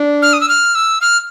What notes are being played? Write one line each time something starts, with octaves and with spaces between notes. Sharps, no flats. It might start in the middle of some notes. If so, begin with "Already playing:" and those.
Already playing: D4
F6
D#6
E6
F6
E6
F6